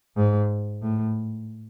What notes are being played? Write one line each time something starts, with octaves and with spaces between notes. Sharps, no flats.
G#2
A2